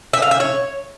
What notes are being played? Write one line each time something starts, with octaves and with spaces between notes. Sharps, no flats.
E5
F5
E5
C#5